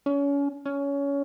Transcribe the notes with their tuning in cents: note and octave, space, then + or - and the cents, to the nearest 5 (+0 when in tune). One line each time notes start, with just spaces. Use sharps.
C#4 +30
C#4 +20